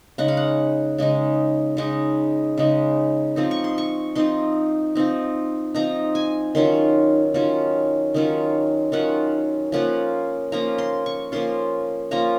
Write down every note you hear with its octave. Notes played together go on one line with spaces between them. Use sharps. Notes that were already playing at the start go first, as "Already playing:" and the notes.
C#3 G#3 D#4 F#5
F5
F#5
C#3 G#3 D#4
C#3 G#3 D#4
C#3 G#3 D#4
F3 C4 D#4
C#6
C6
C#6
F3 C4 D#4 C6
F3 C4 D#4
F3 C4 D#4 A#5
G#5
D#3 F#3 C#4 F4 C6
D#3 F#3 C#4 F4
D#3 F#3 C#4 F4
D#3 F#3 C#4 F4 F#5
F3 A#3 C#4 F4 F#5
F3 A#3 C#4 F4 A#5
C6
C#6
F3 A#3 C#4 F4 C6
F3 A#3 C#4 F4 A#5